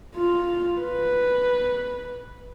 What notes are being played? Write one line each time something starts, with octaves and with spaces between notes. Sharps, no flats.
F4
B4